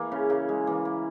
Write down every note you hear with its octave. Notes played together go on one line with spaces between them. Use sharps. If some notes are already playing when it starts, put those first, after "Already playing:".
Already playing: E3 A#3
C#3 C#4
C#3 A#3
G#3
E3 A#3
A#3